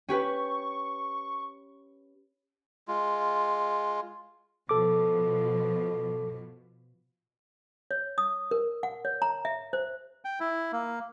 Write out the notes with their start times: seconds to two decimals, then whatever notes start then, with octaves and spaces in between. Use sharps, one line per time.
0.08 C#4 G4 B4 C#6
2.88 G#3 F4
4.69 B2 F3 A4 D6
7.91 C#5
8.18 D#6
8.51 A#4
8.83 F#5
9.05 C#5
9.22 A#5
9.45 E5
9.73 C5
10.25 G5
10.40 E4
10.72 A#3